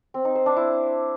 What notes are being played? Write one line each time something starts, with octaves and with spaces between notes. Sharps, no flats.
C4
D#4
C5
D4
E4